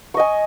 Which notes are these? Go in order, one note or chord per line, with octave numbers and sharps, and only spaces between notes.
D#5 G#5 C#6